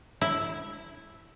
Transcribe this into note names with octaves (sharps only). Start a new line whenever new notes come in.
E4